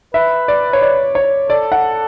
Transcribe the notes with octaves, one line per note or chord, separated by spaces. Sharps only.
B4 E5
D5
C#5
D5
C#5
A4 D5
F#5